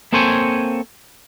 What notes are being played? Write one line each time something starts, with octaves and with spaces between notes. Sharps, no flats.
A#3 C4 A4 C5 C#5 G#5